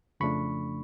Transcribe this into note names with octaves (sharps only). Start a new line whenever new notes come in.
F2 C#3 F3 A3 D4 B5 C#6